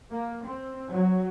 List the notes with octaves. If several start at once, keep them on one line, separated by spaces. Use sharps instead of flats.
A#3
C4
F#3